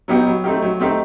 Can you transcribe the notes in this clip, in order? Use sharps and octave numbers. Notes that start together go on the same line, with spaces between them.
F#3 B3 D#4 G4
F#3
A3 C4 D#4 G4
F#3
A3 C4 D#4 G4